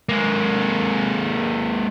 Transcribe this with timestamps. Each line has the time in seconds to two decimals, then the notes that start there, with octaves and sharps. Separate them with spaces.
0.09 G#3 A#3